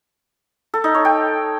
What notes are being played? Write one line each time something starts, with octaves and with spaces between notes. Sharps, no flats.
A4
D#4
C#5
G5